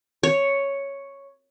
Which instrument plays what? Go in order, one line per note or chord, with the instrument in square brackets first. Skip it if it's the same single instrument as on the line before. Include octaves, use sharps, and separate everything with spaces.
[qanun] C#5